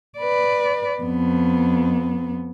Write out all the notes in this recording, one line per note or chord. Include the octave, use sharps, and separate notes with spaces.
B4 D5
F2 B3